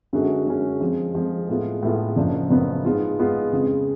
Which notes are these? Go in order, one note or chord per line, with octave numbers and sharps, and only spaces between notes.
F#2 D3 G#3 C#4 F#4
F#2 D3 G#3 C#4 F#4
F2 F3 G#3
F2 F3 G#3
A2 G#3 B3 F4
A2 G#3 B3 F4
F#1 F#2 F3 B3 D4
F#1 F#2 F3 B3 D4
G#2 G#3 B3 F4
G#2 G#3 B3 F4
F2 C#3 G#3